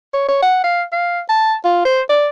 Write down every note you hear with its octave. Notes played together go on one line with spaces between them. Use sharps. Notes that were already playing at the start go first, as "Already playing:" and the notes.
C#5
C#5
F#5
F5
F5
A5
F4
C5
D5